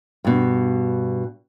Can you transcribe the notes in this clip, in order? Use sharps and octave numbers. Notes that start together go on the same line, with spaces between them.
G2 B2